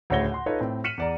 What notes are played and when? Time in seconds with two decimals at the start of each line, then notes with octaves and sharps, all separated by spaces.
0.10 D2 A2 C#3 C#5 A#6 G7
0.31 F#5 C6
0.46 D#4 F4 A4 B4 C#5 D#5
0.60 A2 C4
0.84 F6 B6 C#7 D#7 E7 F#7
0.98 E2 D5 A#5